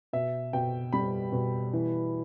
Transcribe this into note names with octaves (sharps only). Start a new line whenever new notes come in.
B2 E5
B2 G5
G3 B5
B2
E3